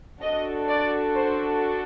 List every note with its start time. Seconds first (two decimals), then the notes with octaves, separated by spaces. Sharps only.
0.21 D4 F#4 A4 D#5
0.68 D5
1.15 C5